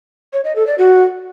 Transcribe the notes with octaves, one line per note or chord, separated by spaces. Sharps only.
C#5
D#5
A4
D5
F#4